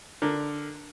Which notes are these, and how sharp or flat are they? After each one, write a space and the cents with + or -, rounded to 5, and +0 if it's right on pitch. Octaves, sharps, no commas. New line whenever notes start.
D3 +0 A#4 +0